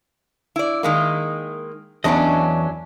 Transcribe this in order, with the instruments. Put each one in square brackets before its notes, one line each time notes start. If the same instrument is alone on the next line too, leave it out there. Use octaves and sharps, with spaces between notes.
[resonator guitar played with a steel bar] E4 D5
D#3 G#3 A#3
[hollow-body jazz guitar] E2 D#5 [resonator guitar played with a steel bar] F#3 C#4 D4